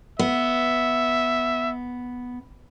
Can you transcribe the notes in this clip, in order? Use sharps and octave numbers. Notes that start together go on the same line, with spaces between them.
B3 E5